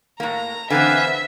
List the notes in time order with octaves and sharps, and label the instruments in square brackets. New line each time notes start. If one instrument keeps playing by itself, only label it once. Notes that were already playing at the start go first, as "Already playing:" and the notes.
[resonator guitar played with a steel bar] A2 A#3 [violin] A#5
[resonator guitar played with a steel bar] D3 E3 C4 [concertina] B4 F5 G#5 [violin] E5